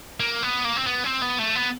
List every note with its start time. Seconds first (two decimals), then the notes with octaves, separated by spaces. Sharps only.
0.20 A#3
0.43 B3
0.65 A#3
0.77 C4
0.87 B3
1.04 C4
1.22 B3
1.38 A3
1.55 B3